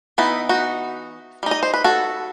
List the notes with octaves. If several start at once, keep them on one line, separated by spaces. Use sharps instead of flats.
E3 B3 D#4 E4
D#4 F#4
G3 D#4
D#5
C5
B4
F#4 A4